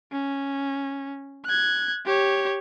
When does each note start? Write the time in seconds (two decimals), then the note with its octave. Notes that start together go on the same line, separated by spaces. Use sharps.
0.13 C#4
1.45 F#6 G#6
2.06 G4 C#5